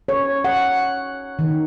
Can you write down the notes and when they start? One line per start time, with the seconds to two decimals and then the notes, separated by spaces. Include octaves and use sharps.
0.08 C#5
0.45 F#5
1.39 D#3